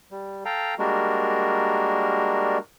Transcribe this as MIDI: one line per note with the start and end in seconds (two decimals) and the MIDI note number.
0.11 0.44 55
0.45 0.74 69
0.45 0.74 77
0.45 0.74 79
0.45 0.74 82
0.79 2.58 55
0.79 2.58 56
0.79 2.58 58
0.79 2.58 62
0.79 2.58 66
0.79 2.58 70